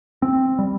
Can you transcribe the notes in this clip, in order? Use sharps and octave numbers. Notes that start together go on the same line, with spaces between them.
C4
G3